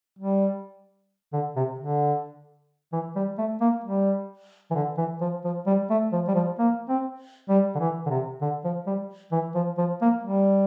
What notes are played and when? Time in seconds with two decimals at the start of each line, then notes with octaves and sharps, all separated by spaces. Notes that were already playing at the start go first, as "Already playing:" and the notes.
0.19 G3
1.33 D3
1.56 C3
1.79 D3
2.92 E3
3.16 G3
3.38 A3
3.61 A#3
3.84 G3
4.71 E3
4.75 D3
4.98 E3
5.21 F3
5.44 F3
5.66 G3
5.90 A3
6.12 F3
6.28 G3
6.35 F3
6.59 A#3
6.89 C4
7.49 G3
7.75 D3
7.79 E3
8.06 D3
8.10 C3
8.41 D3
8.64 F3
8.86 G3
9.32 E3
9.55 F3
9.78 F3
10.01 A#3
10.23 G3